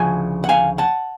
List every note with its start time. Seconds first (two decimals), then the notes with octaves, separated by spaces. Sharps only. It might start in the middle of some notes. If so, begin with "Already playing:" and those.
Already playing: D2 C#3 F3 G#5
0.44 F#5
0.49 F5 G#5
0.78 F#5 A5